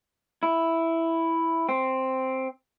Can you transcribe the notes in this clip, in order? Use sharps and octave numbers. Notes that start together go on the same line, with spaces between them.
E4
C4